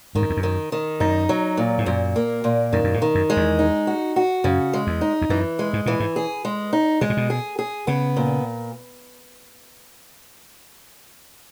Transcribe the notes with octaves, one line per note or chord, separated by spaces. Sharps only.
G#2 D#3
F#2
E2
F#2
D#3
D#3
F#2 D#4
F#3
A#2
G#2
F#2 A#2
A#3
A#2
F#2 D#3
F#2
G#2
D#3
F#2
G#3
E2
D#4
F#4
F#4
F#2 C#3
G#3
E2
D#4
E2
F#2 E3
G#3
G#2
A#2 E3
G#2
G#4
G#3
D#4
B2 G#3
A#2
B2
G#4
G#4
C#3 B3
A#2